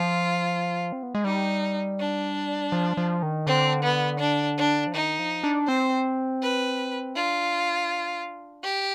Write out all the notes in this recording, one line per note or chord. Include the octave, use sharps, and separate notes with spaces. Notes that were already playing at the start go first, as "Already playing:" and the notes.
Already playing: F3 F4
C4
B3
G#3
G3 D#4
D4
F3
F3
D#3
D3 C4
B3
D4
D4
F3
D#3 D#4
F3
D4
C4 C5
B4
D4 F4
G4